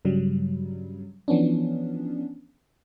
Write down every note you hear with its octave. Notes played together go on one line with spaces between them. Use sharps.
G2 C#3 F#3 G3
E3 F3 B3 C#4 D4